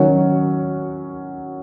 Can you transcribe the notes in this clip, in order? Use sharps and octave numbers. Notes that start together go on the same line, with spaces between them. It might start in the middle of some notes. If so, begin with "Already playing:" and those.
Already playing: D#3 F#3 C#4 F#4